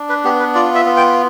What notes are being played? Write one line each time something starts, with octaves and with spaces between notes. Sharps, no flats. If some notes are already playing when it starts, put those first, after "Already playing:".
Already playing: D4
B4
B3 G4
B4
F4 D5
E5
B3
G5